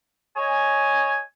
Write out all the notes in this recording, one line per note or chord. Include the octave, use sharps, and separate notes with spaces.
C#5 D#5 G#5